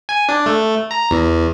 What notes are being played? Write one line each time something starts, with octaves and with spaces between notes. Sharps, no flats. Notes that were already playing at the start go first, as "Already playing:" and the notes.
G#5
D4
A3
A#5
E2